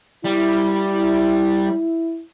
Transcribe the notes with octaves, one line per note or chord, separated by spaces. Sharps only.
G3 E4